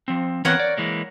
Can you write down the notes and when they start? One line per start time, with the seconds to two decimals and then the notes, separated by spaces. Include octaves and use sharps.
0.08 F3 C4
0.45 E3 B3 C4 A#4 C#5 F#5
0.60 D5
0.77 E3 G#3 A#3